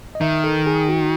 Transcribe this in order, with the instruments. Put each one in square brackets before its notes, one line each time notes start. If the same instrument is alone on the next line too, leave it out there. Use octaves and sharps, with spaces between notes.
[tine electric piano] D#5
[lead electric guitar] D#3 [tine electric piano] E5
[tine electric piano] A4
G#4
F#4